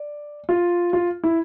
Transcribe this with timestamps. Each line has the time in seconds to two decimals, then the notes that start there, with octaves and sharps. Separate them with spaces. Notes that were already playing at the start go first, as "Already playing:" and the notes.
Already playing: D5
0.49 F4
0.93 F4
1.24 E4